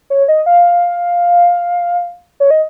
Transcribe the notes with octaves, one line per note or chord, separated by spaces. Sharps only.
C#5
D#5
F5
C#5
D#5